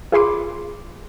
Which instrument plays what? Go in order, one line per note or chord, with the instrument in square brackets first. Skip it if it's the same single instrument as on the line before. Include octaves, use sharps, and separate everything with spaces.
[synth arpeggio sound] F4 G#4 B5 C6 D6